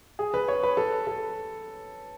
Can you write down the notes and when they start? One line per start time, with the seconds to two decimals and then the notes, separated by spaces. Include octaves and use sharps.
0.19 G#4
0.34 B4
0.48 C#5
0.63 B4
0.77 A4
1.07 A4